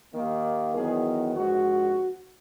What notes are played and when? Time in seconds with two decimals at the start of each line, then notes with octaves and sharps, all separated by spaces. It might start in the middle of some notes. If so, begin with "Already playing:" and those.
0.13 D#2 D#3 A#3
0.74 E2 D#3 F#3 B3 G#4
1.34 A#1 G#2 F#4